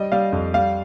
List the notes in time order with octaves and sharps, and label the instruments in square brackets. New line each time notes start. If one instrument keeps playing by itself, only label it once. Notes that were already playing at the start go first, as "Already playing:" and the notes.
Already playing: [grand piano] G3 D#5
G3 F5
F2
G3 F5